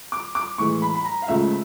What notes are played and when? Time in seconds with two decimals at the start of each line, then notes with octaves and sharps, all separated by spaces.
0.12 D6
0.35 D6
0.58 A2 E3 G#3 C#6
0.82 B5
0.95 B5
1.05 A#5
1.22 F5
1.28 C#2 C#3 F3 A3 E5